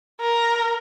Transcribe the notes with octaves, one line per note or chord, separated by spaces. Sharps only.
A#4